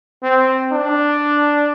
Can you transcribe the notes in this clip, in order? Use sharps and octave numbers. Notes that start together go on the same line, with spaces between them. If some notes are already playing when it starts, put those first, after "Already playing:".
C4
D4